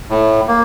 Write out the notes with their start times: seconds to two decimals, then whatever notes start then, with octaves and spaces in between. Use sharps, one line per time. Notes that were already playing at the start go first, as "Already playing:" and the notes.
0.10 A2
0.48 A#3